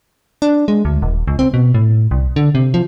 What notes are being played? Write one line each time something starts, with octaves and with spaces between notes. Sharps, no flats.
D4
G#3
D2
D#1
C#2
C4
B2
A2
C2
D3
C3
F3